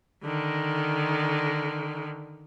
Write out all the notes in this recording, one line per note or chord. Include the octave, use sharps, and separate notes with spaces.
D3 D#3